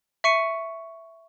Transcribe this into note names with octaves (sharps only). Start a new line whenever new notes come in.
E5 C#6 C#7 D#7